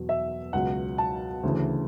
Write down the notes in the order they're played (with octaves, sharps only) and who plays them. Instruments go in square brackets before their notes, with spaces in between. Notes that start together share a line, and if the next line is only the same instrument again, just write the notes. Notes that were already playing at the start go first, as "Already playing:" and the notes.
Already playing: [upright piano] E2 B2 F#3
E5
C#2 B2 F#3 F#5
A5
D2 C#3 E3